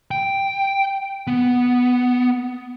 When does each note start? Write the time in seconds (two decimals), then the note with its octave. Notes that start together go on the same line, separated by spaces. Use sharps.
0.11 G5
1.27 B3